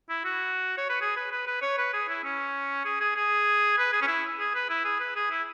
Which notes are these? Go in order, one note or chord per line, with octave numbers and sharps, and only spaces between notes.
E4
F#4
C#5
B4
G#4
B4
B4
B4
C#5
B4
G#4
E4
C#4
G#4
G#4
G#4
B4
G#4
C#4
E4
G#4
B4
E4
G#4
B4
G#4
E4